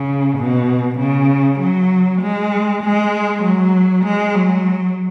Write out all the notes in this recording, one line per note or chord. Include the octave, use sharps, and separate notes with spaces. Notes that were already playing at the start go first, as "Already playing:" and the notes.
Already playing: C#3
B2
C#3
F#3
G#3
G#3
F#3
G#3
F#3